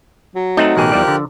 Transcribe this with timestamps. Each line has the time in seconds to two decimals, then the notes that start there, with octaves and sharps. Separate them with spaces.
0.36 F#3
0.57 A3 C4 D#4 F#5
0.77 A1 B2 G4 G#4 A#4 F#6
0.92 E2 F3 G3 D5
1.08 D3